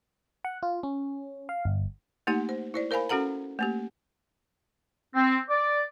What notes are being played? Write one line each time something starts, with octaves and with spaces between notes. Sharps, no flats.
F#5
F4
C#4
F5
G1
A3 A#3 D#4 G4 F#5
C5
E4 C5 D5
A#4 C5 F5 G#5 B5
C#4 F#4 A4 F#5 A#5
A3 A#3 G4
C4
D5